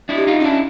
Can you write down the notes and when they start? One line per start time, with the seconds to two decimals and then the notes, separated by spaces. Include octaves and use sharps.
0.09 D4 E4
0.16 G4
0.27 D#4 F4
0.39 C#4 F4
0.44 D4 E4